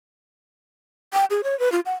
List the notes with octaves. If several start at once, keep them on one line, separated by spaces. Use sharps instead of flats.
G5
G#4
C#5
B4
F4
F#5